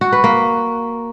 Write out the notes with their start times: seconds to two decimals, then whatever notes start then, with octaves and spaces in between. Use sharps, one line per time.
0.01 F#4
0.12 B4
0.24 A#3